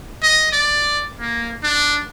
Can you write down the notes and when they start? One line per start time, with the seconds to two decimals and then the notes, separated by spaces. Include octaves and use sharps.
0.22 D#5
0.52 D5
1.20 A#3
1.63 D4